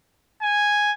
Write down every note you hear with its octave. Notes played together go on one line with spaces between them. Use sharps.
G#5